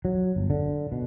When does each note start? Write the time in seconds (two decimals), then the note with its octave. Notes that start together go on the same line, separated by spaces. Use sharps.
0.05 F#3
0.36 G1
0.50 D3
0.92 B2